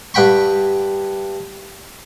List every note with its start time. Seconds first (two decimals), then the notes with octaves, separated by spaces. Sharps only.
0.14 G2 F#5 G5 B5 C#6